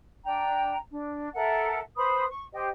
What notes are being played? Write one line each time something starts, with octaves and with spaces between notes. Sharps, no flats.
D4 G5 A#5
D4
A4 A#4 E5 F#5
B4 C5 B5 D#6
C#6
G4 C5 D#5 G5